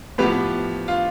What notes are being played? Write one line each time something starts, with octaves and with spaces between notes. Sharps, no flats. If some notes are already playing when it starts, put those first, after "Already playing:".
A2 F3 B3 G4 B4
F4